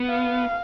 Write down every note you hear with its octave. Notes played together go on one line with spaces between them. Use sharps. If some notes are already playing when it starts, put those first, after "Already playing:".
Already playing: B3
F5